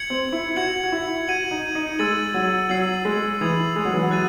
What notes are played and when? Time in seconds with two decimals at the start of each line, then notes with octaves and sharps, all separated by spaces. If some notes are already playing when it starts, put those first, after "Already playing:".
Already playing: G#6 C#7 F#7
0.10 C4
0.33 E4
0.56 F#4 G#6 C#7 F#7
0.84 F#4
0.92 E4
1.28 F#4 G#6 D#7 F#7
1.51 D#4
1.75 D#4
1.99 G#3 E6 A6 D#7 F#7
2.34 F#3
2.69 F#3 E6 C7 F#7
3.05 G#3
3.41 E3 D#6 G#6 D#7 F#7
3.76 G#3
3.85 F#3
3.94 E3
4.02 F#3
4.11 F#6 A6 D#7 F#7